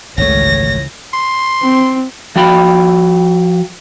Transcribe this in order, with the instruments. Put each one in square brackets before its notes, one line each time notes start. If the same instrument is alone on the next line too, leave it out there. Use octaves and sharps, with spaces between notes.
[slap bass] G#1 F#2 A3 [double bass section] C#2 E3 [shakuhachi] C#5 [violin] A#6
[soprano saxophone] C6
[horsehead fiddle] C4
[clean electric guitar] F3 F#4 G5 B5